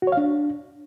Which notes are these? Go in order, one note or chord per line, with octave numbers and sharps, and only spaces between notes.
F#4
C#5
F5
D4